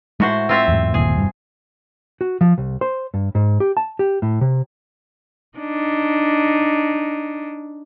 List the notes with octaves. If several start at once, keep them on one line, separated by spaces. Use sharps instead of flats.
A2 G#3 F#4 C5
C4 F4 E5
E2 G#2
G1 D#2 A#2 G#4
E1 G2
F#4
F3
C2
C5
G2
G#2
G4
A5
G4
A2
C3
D4 D#4